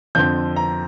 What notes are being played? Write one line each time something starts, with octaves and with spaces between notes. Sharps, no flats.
F2 D3 F3 C4 G6
A#5